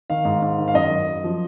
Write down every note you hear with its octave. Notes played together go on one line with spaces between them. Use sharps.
D#3 F5
G#2
G#2
D#3
F5
F#2 D#5
F#2
F#2
F3